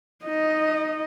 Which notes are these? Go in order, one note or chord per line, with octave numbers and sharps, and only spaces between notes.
D#4 D#5